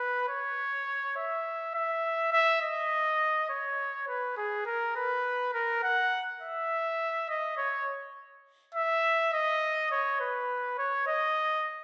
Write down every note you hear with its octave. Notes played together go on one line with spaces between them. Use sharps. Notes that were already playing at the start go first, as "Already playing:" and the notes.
Already playing: B4
C#5
E5
E5
E5
D#5
C#5
B4
G#4
A#4
B4
A#4
F#5
E5
D#5
C#5
E5
D#5
C#5
B4
C#5
D#5